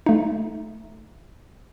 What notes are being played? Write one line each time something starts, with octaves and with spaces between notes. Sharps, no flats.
A3 D#4